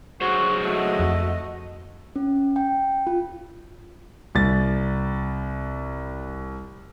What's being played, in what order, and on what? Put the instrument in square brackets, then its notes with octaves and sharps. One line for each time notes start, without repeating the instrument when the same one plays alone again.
[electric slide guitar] F#3 G#4 C5 [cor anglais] F#4
[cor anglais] A3 [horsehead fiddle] F#4 D#5
[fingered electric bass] F2
[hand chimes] C#4
G5
F4
[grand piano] C2 A6